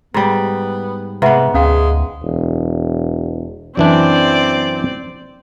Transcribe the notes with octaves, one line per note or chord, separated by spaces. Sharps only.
G#2 G3 B3
G#2 C3 B3 B4 E5 F#5
D2 G#3 C#4 F5 G5
E1
F#2 E3 C4 D4 D5